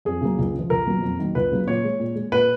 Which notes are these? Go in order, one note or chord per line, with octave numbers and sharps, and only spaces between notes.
F2 G#4
C#3 F#3 A#3
C#2
C#3 F3
C#2 A#4
B2 F#3 A#3
F2
D#3 F#3 A#3
C#2 B4
C#3 F#3 A#3
A#2 C#5
G#3
A#2
G#3
A#2 B4